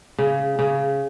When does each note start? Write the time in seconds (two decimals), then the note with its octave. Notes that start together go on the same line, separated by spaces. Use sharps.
0.18 C#3
0.59 C#3